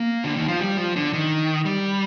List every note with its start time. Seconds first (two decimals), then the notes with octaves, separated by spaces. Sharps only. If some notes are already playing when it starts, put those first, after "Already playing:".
Already playing: A#3
0.24 D3
0.36 D#3
0.48 F3
0.60 G3
0.77 F3
0.96 D3
1.13 D#3
1.65 G3